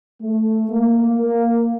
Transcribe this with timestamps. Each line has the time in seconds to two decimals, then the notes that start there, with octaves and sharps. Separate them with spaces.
0.22 A3
0.70 A#3
1.19 A#3